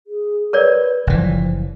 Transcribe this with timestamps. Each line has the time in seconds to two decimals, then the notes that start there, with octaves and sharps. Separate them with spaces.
0.07 G#4
0.53 A#4 B4 C#5 D5
1.07 F#1 E3 F3